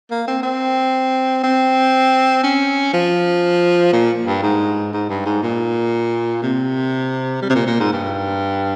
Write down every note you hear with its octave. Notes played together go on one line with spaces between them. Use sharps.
A#3
C4
C4
C4
C#4
F3
A#2
G2
G#2
G#2
G2
G#2
A#2
C3
G3
C3
A#2
A#2
G#2
G2